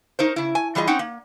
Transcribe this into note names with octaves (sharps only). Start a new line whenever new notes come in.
D#4 A#4 C5
C#3 E4
G#5
E3 G3 F4 G#4 D#5
C4 C#4 D#4 F#5 G5
A#3